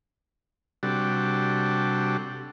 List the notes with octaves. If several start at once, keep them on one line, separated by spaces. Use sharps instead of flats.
C3 G3 D4 F#4 A4